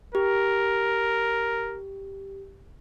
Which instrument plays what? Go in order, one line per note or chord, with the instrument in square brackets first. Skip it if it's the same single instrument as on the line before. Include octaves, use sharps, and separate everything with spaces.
[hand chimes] G4 [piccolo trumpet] A#4